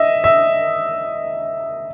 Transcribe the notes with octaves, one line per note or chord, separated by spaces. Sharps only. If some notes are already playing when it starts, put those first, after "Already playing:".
Already playing: D#5 E5
E5